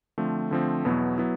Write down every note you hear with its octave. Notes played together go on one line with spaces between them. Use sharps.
D3 F3 A3 C4
D3 F3 A3 C4
E2 B2 F#3 B3 E4
F#3 B3 E4